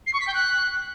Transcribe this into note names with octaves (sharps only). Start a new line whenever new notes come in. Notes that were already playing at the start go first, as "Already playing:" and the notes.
C7
C#6
B6
G5
F#6